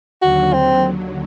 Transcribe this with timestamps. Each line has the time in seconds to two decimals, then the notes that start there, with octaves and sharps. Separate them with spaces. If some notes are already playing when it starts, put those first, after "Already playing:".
0.22 D#2 D3 F#3 F#4
0.53 C4